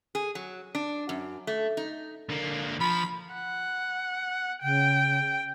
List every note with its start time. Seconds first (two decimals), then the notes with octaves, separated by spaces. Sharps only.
0.15 G#4
0.35 F#3
0.75 D4
1.09 F#2
1.47 A3
1.77 D#4
2.30 D3 A#3
2.81 F3 B5
3.33 F#5
4.63 C#3 G5